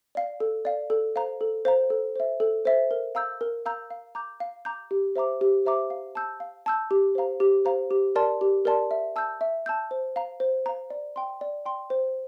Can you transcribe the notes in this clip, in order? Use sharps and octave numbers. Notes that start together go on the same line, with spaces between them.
D5 F5
A4
D5 F5
A4
C5 F5 A#5
A4
C5 F5 A#5
A4
C5 E5
A4
C5 E5
A#4
F5 A#5 E6 G6
A#4
F5 A#5 E6 G6
F5
A#5 D6 G6
F5
A#5 D6 G6
G4
C5 E5 A#5 D6
G4
C5 E5 A#5 D6
F5
A5 E6 G6
F5
A5 E6 G6
G4
C5 F5 A#5
G4
C5 F5 A#5
G4
A#4 D5 A5 C6
G4
A#4 D5 A5 C6
E5
A5 E6 G6
E5
A5 E6 G6
C5
F5 A#5
C5
F5 A#5
D5
G5 C6
D5
G5 C6
C5